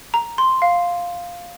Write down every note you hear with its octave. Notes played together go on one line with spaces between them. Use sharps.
A#5
C6
F5